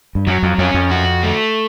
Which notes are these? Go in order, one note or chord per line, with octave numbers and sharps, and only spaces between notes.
G2
F#2 F#3
F2
F2 C#4
F2
F#4
A3